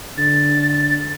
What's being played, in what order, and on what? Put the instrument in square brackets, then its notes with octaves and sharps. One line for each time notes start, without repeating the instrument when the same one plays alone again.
[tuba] D3 [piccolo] A6